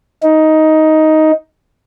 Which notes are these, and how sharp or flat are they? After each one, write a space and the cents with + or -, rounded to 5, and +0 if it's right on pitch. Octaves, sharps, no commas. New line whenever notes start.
D#4 +10